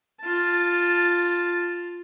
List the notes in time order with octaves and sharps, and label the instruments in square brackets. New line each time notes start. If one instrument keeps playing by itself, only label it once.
[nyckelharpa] F4 A5